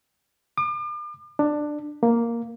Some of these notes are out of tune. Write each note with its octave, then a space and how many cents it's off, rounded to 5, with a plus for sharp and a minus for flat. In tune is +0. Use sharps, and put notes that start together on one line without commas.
D6 +40
D4 +15
A#3 +0